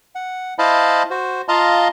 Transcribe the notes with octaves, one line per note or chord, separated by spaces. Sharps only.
F#5
E4 C5 D#5 F5 A5 B5
F#4 C5
F4 D#5 F5 A5 A#5 C6